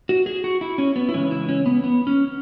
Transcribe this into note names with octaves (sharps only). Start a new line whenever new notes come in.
F#4
G#4
F#4
E4
C#4
B3
E4
C#3 E3 G#3 C#4
E4
C#4
B3
B3
C#4